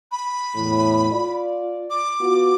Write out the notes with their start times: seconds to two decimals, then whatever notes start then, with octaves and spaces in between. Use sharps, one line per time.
0.11 B5
0.55 E2 A2
1.11 F4 D5
1.90 D6
2.21 B3 F4 F#4